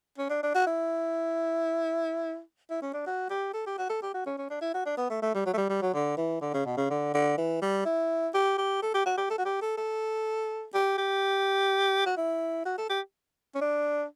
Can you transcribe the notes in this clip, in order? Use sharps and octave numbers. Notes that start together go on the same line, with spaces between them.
C#4
D4
D4
F#4
E4
E4
C#4
D4
F#4
G4
A4
G4
F#4
A4
G4
F#4
C#4
C#4
D4
E4
F#4
D4
B3
A3
A3
G3
F#3
A3
G3
G3
F#3
D3
E3
D3
C#3
B2
C#3
D3
D3
E3
G3
E4
G4
G4
A4
G4
F#4
G4
A4
F#4
G4
A4
A4
G4
G4
F#4
E4
F#4
A4
G4
C#4
D4